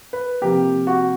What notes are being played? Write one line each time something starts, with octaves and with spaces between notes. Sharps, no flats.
B4
C3 F3 A#3 G4
F#4